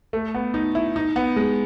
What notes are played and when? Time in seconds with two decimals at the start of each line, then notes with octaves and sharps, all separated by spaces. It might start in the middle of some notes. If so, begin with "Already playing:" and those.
0.13 A3
0.34 B3
0.54 D#4
0.75 E4
0.96 D#4
1.16 B3
1.36 G#3